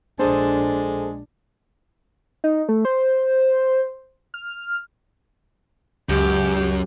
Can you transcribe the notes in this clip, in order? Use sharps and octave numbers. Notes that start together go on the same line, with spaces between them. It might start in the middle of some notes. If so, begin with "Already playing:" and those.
A#1 G#3 D4 G#4 A4 C5
D#4
A3
C5
F6
C#2 F#2 G4